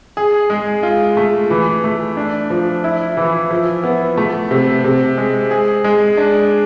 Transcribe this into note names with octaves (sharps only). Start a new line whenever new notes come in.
G#4
G#3
F4
A3
E3
A3
D4
F3
E4
E3
F3
B3
A3
C3
C3
G#3
G#4
G#3
D4